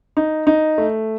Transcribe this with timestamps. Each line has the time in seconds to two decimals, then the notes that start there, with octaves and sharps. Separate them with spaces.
0.17 D#4
0.47 D#4
0.78 A3